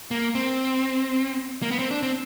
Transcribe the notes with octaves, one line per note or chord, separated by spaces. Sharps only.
A#3
C4
A#3
B3
C4
D4
C4